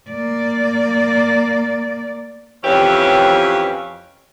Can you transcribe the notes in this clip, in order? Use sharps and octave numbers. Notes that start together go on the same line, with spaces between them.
A#3 D5
F2 E3 C#4 G4 B4 C#5